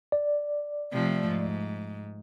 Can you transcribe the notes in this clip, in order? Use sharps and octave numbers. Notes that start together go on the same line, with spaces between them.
D5
C3 F3 A3
G#2